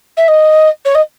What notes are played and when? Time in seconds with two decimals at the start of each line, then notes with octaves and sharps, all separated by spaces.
0.17 E5
0.28 D#5
0.85 C#5
0.94 D#5